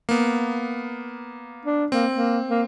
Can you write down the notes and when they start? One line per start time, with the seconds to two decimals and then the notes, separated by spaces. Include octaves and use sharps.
0.09 A#3 B3
1.65 D4
1.92 A#3 C4
2.14 A#3
2.50 A#3